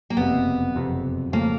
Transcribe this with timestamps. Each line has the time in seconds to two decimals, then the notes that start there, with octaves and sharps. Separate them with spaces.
0.10 A#3
0.17 F#1 F2 C3 B3
0.75 F#1 F2 C3
1.32 F2 C#3 F3 A3 A#3